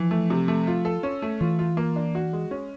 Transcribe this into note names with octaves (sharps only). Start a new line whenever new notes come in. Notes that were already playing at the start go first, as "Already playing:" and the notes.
Already playing: E3 F3
A3
C3
A3
F4
A4
C#4
A3
E3 F4
F4
A#3
D4
F#4
G#3
C#4